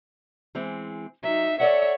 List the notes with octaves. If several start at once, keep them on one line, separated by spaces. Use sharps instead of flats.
E3 G#3 C4
F#3 D#4 E5
A4 C#5 D5 E5 F#5